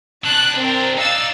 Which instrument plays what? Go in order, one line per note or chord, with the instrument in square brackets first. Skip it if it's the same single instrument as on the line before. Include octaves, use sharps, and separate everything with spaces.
[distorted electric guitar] C3 D4 [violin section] A5 F#6
[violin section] C4 A#4
[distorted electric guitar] D4 D#4 [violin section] F5 E6 A6